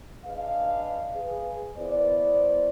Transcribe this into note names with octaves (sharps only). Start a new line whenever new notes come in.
D4 G#4 B4 D#5 F5
G#4 B4
B3 E4 C5 D5